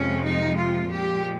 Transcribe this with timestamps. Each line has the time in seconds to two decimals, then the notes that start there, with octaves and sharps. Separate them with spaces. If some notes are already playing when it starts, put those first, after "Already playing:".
Already playing: F2 C3 F3 G#3 C#4
0.25 D#4
0.58 F4
0.90 A#2 F3 G#3 G4